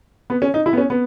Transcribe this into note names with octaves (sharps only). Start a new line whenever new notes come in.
B3
C#4
D#4
E4
B3
C#4
B3